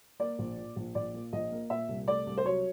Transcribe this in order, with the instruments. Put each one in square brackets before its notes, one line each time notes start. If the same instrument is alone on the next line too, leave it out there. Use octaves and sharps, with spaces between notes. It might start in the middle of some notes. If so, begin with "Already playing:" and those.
[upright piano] A#3 D5
A#1
A#2
A#1
A#1 D5
A#2
A#1 D#5
A#3
A#2 E5
C2
A3 D5
C2
C5
F#3 C#5